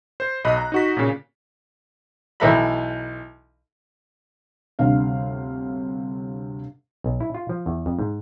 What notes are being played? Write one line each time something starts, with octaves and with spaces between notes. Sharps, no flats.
C5
B1 D#5 B5 F#6
A#5
D#4 F#4 B6
A#2 C#3
B1 E3 A4 E5 A#5 B5
G1 D2 C3 F5
B1
E4
F4
F3
E2
F2
G#2